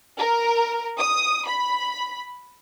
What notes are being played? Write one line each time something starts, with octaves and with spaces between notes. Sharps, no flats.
A#4
D#6
B5